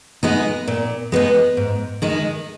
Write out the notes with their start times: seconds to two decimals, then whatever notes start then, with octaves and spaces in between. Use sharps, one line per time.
0.23 G#3 B3 D#4
0.67 A#2
1.12 G#3 B3 D#4
1.57 G#2
2.02 D#3 G#3 D#4